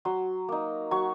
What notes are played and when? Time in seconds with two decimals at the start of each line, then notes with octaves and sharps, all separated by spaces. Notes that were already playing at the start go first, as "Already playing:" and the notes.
0.05 F#3 C6
0.49 A#3 D#4
0.91 F#3 C#6